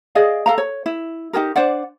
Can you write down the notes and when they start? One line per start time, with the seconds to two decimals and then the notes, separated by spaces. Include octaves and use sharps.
0.15 G#4 D5 D#5 F5
0.46 A4 F5 A#5
0.58 C#5
0.86 E4
1.33 D#4 G4 G#4 A#4
1.56 D4 C5 D5 F#5